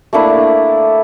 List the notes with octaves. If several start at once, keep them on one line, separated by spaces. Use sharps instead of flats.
A3 A#3 D4 E4